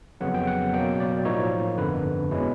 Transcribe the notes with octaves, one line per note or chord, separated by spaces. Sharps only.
F2 C#3 F#3 B3 F#5
G5
F#5
B2 F#3 A#3 G5
D5
A2 F3 A#3 D#4 C#5
G1 F2 D3 B4
B2 G#3 C#4 E4